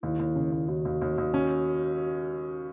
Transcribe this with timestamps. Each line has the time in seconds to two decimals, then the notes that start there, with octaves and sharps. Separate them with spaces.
0.03 D#2 E4
0.19 D#2
0.36 C#3
0.52 D#2
0.68 D#2 F#4
0.85 D#2
1.02 D#2
1.18 D#2
1.34 C#4